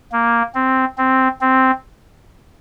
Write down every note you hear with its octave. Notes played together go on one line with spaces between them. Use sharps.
A#3
C4
C4
C4